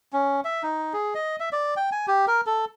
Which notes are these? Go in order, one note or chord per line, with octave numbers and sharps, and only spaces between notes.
C#4
E5
D#4
G#4
D#5
E5
D5
G5
G#5
G4
A#4
A4